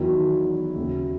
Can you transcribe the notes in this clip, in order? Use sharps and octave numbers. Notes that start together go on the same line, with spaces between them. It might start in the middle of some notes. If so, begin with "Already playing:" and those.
Already playing: E2 D#3 F#3 E4
D#2 C#3 F#3